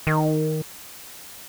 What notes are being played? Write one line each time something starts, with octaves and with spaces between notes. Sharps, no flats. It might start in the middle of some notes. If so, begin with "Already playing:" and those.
D#3